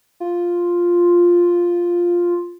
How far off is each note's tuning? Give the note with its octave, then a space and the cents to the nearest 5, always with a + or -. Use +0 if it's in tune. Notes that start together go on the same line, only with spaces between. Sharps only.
F4 +0